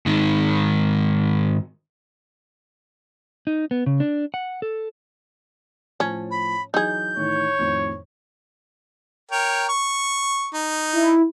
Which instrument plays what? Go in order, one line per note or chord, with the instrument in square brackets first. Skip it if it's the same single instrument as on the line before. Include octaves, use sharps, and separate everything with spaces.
[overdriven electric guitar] G#2 D#3
[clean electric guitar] D#4
B3
C#3
D4
F#5
A4
[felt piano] A2 F3 A5 [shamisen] C#4
[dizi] B5
[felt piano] E3 F#3 [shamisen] D#4 G#4 [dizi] G6
[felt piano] A2 D#3 E3 [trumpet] C#5
[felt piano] F2 A2 D#3
[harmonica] A#4 C#5 G5
C#6
D#4
[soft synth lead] E4